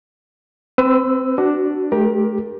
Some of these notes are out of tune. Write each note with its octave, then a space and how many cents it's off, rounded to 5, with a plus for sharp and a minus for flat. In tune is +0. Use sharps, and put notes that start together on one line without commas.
C4 +0 B4 +35 E6 +0
D4 +0 F#4 +20
A3 -35 G4 +0 A#4 +25